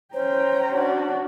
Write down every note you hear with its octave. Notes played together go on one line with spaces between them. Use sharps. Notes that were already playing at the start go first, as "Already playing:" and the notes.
C#4 C5 C#5 G5 A#5
D4 F#4